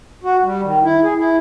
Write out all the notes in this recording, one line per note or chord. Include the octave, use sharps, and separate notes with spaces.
F#4
G3
D#3
E4
G#4
E4